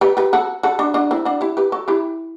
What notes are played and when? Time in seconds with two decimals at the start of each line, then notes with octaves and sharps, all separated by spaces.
0.01 G4 B4
0.17 G4 B4
0.33 F#4 A4
0.63 F#4 A4
0.79 D4 F#4
0.94 D4 F#4
1.11 C4 E4
1.25 D4 F#4
1.41 E4 G4
1.57 G4 B4
1.72 F#4 A4
1.88 E4 G4